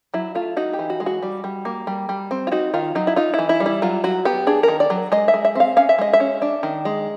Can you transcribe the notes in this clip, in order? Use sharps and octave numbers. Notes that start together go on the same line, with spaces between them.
F#3 E4
A3 F4
D#4 F#4
G4
E3
F#4
G#3
F#4
G3
G3
A#3
G3
G3
C4
F4
D#4 F#4
D#3 F4
F#3 D#4
E4
D#4 F4
E3 E4
E4
G3
E4
F#3 F4
F#3 F#4
B3 G4
D4 G#4
A#4
D#3
D5
F#3
G#3 D#5
E5
G#3
E5
C4 F5
C#4 F5
E5
G#3 D#5
E5
C#4
D4
D#3
G#3